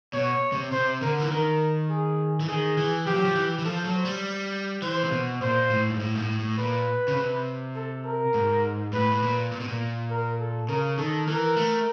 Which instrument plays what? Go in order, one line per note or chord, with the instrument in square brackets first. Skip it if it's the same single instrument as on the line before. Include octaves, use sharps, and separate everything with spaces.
[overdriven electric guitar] B2 [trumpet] C#5
[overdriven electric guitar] C3
[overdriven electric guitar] C3 [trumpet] C5
[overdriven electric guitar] D3 [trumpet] A#4
[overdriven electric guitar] E3
[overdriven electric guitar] D#3 [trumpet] A#4
[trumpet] G#4
[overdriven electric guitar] E3
[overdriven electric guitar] D#3 [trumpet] G#4
[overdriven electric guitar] E3
[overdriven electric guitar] F3 [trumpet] G4
[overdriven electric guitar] F#3
F3
E3
E3
[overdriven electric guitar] F3 [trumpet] A4
[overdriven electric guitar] F#3
[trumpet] C5
[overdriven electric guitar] G3
[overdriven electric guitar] E3 [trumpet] C5
[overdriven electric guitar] C3
B2
[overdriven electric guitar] A#2 [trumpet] C5
[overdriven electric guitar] A2
G#2
A2
G#2
A2
A2
[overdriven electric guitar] A#2 [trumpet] B4
[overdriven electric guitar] C#3
C3
[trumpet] A4
A#4
[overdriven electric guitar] G#2
[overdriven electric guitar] A2 [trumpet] B4
[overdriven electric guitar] A2
A#2
A#2
B2
A#2
[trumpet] A#4
A4
[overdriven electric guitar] C#3 [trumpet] A#4
[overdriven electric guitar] D#3 [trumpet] A4
[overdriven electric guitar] E3 [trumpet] A#4
[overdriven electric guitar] A3